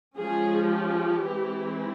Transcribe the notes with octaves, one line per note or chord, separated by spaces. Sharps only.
F3 G#3 C#4 G#4
G4
E3 G#3 C4 E4